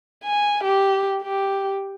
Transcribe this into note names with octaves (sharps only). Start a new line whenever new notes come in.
G#5
G4
G4